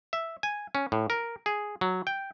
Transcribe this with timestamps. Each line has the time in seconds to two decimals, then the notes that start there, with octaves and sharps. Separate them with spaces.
0.13 E5
0.43 G#5
0.75 C#4
0.92 A2
1.10 A#4
1.46 G#4
1.81 F#3
2.07 G5